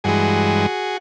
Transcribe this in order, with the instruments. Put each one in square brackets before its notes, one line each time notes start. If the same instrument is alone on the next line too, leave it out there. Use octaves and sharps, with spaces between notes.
[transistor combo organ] G2 E3 G#3 F#4 G#4